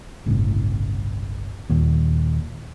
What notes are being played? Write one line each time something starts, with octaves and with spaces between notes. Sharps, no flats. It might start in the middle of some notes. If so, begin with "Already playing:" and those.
G1 C2 A2 C#3
D#2 A#2